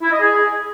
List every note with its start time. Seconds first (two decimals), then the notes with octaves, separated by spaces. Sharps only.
0.02 E4
0.11 D#5
0.21 G#4